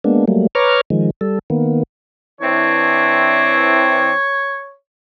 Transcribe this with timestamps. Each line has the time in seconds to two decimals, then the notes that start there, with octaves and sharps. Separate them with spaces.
0.04 G#3 A#3 B3 D4
0.28 F#3 G3 A3 A#3
0.55 B4 C#5 A#5 C#6 D6 F6
0.90 D#3 F3 G#3
1.21 G3 A4
1.50 D#3 A#3 B3
2.41 E3 C4 D4 C#5